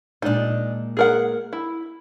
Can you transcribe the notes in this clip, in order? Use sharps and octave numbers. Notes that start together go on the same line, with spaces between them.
A#2 G#3 D4 D#4
G#4 A#4 F#5
E4